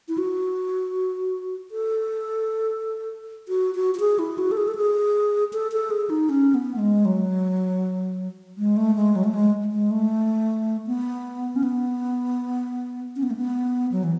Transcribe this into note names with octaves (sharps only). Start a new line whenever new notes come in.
E4
F#4
A4
F#4
F#4
F#4
G#4
E4
F#4
A4
G#4
A4
G#4
A4
A4
G#4
D#4
C#4
B3
A3
G#3
F#3
G#3
A3
G#3
F#3
A3
G#3
G#3
A3
B3
C#4
B3
C#4
B3
A3
B3
F#3
E3